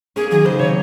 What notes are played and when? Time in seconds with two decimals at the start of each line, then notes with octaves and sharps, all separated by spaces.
0.16 A#3 C#4 G#4
0.31 D#3 F#3 G#4
0.44 C#3 C5
0.59 C3 C#5